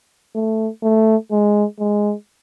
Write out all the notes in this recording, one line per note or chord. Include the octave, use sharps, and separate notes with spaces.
A3
A3
G#3
G#3